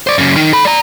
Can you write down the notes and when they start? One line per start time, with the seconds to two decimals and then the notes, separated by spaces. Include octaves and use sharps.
0.07 C5 D5
0.18 F#2 C#3
0.36 D#3
0.53 A4 B5
0.65 D5 A#5